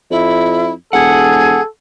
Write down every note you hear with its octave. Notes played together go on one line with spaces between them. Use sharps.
F2 E4
E1 G#4 A4 F#5